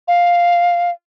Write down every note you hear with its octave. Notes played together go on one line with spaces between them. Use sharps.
F5